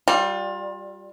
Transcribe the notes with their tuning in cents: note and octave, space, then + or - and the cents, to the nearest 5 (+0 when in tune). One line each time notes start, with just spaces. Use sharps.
G3 +0 F4 +30